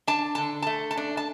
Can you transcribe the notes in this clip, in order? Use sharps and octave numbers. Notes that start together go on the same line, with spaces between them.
D4 A5
D3 A5
A3 A5
A5
D4
A5